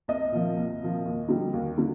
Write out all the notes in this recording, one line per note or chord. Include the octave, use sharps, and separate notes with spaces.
C2 D#5
A#2 F3
C2
A#2 F3
D#2
D3 G3
D#2
D3 G3